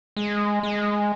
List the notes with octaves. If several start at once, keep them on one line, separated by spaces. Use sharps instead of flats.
G#3
G#3